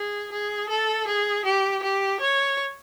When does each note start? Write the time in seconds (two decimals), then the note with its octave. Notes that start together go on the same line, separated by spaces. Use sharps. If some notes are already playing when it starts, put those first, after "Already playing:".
Already playing: G#4
0.32 G#4
0.69 A4
1.07 G#4
1.45 G4
1.83 G4
2.20 C#5